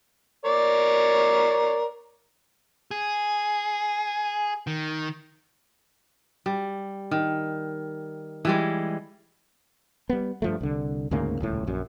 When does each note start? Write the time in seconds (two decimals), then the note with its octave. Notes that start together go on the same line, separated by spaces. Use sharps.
0.45 A#4 C#5 D5
2.91 G#4
4.67 D#3
6.46 G3
7.11 D#3
8.45 E3 G3 G#3
10.09 G3 B3
10.42 G2 F3 A3
10.61 C2 D3
11.11 D2 G#2 C#3 A#3
11.40 D#1 C#2 A2
11.67 A#1 F#2